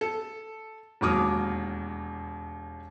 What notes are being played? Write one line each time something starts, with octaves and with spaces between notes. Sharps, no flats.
A4
E1 D#2 F#3 D6 D#6 F6